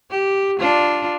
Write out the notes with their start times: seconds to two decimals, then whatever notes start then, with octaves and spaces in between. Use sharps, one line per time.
0.10 G4
0.60 D4 F4